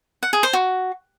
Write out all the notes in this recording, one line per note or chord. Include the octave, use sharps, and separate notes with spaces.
F#5
G#4
C5
F#4